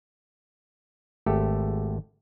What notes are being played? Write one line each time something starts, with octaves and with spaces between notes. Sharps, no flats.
G#1 A3 G4 A4